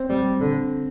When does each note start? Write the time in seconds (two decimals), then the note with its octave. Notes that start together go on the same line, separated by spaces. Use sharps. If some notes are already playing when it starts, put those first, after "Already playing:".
Already playing: C4
0.10 G3
0.40 D3